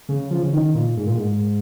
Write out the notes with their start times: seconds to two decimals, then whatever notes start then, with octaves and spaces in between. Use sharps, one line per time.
0.09 C#3
0.31 F3
0.43 C#3
0.53 D#3
0.75 A#2
0.97 G#2
1.07 A#2
1.17 G#2